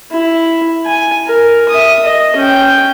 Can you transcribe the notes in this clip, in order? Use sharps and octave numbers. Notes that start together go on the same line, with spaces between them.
E4
G#5
A#4
E5 D#6
D#5
C#4 G5